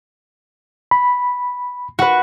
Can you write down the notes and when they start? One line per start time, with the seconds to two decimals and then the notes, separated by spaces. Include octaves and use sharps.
0.91 B5
1.99 F#4 B4